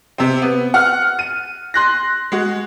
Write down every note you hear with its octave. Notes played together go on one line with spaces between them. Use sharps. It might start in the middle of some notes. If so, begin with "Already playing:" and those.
C3 C4
B3
F#5 F6
D#7
C6 F#6 A#6
G#3 F#4